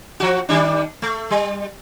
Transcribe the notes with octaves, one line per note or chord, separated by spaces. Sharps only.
F3 F#4
D#3 G3 D4
A3
G3